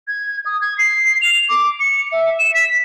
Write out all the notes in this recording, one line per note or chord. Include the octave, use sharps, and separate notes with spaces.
G#6
D#6
G#6
C7
F7
D6
C#7
E5
E7
B6